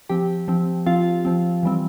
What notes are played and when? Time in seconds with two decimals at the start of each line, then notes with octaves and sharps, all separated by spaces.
0.09 F3 C4 G4 G5
0.48 F3 C4
0.86 F3 C4 F4 F5
1.25 F3 C4
1.63 E3 G3 C4